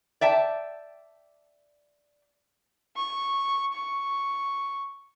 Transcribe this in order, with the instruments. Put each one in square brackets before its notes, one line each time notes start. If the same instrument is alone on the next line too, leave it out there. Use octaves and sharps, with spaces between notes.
[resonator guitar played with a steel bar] D5 E5 G5 A5
[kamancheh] C#6
C#6